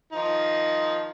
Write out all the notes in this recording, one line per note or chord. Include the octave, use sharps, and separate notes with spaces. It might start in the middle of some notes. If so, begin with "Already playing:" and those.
D#3 F3 D#4